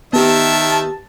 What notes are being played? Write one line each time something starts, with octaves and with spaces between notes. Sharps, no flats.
D#3 B3 G4 E5 A5